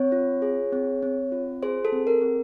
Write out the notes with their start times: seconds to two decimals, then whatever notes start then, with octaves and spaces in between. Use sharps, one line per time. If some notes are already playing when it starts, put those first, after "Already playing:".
Already playing: C4 C#5
0.12 F4
0.42 G#4
0.72 C4
1.03 C4
1.32 F4
1.62 G#4 C5
1.85 A4
1.92 C4
2.07 A#4
2.21 C4